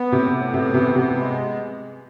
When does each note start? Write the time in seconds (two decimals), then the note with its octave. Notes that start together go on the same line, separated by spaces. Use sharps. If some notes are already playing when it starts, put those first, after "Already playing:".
Already playing: B3
0.12 A2 C3
0.33 A2
0.54 C3 B3
0.74 C3 E3
0.95 C3 B3
1.16 G#3